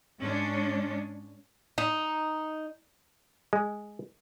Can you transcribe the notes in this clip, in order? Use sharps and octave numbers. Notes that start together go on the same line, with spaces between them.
G#2 G#3 C#4 D4
D#4
G#3